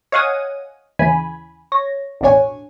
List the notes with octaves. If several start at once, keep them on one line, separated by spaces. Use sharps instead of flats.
C#5 D#5 F5 F#5 G#5 D#6
D#2 C#3 E3 G#5 B5
C#5 A#6
A1 E2 B2 D4 C#5 G#5